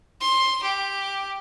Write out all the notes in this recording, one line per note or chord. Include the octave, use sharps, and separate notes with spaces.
C6
G4